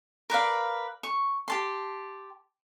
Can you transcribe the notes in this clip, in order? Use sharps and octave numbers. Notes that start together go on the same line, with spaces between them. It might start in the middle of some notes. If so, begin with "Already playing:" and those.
A#4 B4 D5 F5
C#6
G4 A5 C6